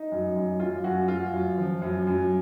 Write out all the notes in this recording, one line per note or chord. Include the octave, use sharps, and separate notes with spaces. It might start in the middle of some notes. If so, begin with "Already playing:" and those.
Already playing: D#4
F#2
F#2
F#2 F4
F#2 F#4
F#2 F4
F#2
F3
F#2
F#2